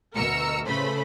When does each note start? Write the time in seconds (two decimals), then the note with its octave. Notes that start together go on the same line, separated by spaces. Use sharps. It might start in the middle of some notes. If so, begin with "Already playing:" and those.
0.14 D2 B2 A#4 A#5 E6 C#7
0.65 A2 C#3 A3 B4 C5 B5